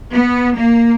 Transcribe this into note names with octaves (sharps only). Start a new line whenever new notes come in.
B3
A#3